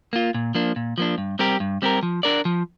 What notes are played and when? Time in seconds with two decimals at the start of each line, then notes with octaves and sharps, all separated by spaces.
0.13 A#3 F4
0.34 A#2
0.55 F3 A#3 D4
0.76 A#2
0.98 F3 A#3 D4
1.18 G2
1.39 G3 C4 G4 A#4
1.60 G2
1.82 G3 C4 G4 A#4
2.03 F3
2.23 D4 A#4 D5
2.45 F3